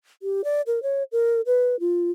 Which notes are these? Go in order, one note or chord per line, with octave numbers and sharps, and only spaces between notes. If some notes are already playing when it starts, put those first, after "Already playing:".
G4
D5
A#4
C#5
A#4
B4
F4